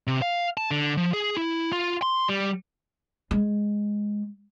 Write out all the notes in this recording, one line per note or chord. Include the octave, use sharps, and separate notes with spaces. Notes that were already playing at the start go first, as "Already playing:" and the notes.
C3
F5
A5
D3
F3
G#4
E4
F4
C6
G3
G#3